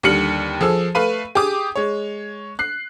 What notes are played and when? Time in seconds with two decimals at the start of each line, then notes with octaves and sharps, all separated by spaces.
0.03 D#2 D3 G3 F6 C#7 F#7
0.61 F3 G#4 A4 E6
0.95 A3 B4 F5 B5 D#7
1.35 G4 G#4 D6 D#6
1.76 G#3 C#5
2.59 F#6 C7